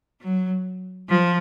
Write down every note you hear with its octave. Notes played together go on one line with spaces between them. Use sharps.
F#3
F3